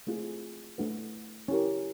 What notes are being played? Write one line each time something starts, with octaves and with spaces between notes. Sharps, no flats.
A3 C4 F4 G#4
A3 D4 F#4 B4
C#4 E4 G4 A#4